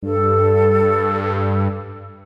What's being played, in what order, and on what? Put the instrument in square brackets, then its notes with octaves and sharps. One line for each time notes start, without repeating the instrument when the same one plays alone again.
[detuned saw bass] G2 [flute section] A4